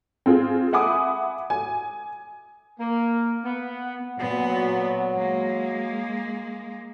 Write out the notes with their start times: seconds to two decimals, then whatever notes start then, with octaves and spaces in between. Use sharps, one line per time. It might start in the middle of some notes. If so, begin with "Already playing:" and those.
0.26 C4 F4 G#4
0.73 E5 F#5 G#5 B5 D6 D#6
1.50 G#5
2.80 A#3
3.45 B3
4.19 A#2 F#3 B3
5.15 G#3 A#3